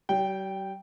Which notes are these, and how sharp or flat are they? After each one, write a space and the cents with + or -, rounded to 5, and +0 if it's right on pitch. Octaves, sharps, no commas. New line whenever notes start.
G3 -45 G5 +0